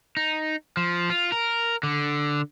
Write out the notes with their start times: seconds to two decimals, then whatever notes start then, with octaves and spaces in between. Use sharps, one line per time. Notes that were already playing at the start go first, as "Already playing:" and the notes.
0.17 D#4
0.77 F3
1.10 F4
1.32 A#4
1.83 D3